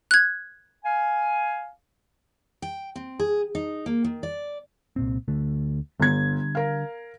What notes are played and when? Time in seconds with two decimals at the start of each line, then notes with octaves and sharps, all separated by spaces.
0.11 F#6 G#6
0.84 F5 G#5
2.62 G5
2.96 C4
3.20 G#4
3.55 D#4
3.86 A#3
4.04 D#3
4.23 D5
4.96 C2 A#2 C4
5.28 D2 D3 A3
6.00 G1 D3 G3 G#6
6.55 A#4 F5